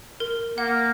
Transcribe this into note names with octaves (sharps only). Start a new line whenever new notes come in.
A#4
A#3 F#5